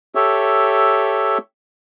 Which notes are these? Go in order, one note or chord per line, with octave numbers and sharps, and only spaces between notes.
G4 A4 C#5 E5